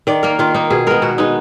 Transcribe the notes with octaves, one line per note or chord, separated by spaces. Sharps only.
D#3 D5
A#3 A#4
D#3 F4
A#3 D#4
B2 G#4
G#3 B3 A#4
B2 F#4
G#3 B3 D#4